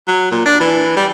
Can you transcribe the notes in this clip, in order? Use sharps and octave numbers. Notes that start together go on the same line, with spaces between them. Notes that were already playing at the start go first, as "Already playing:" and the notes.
F#3
A#2
D4
E3
G3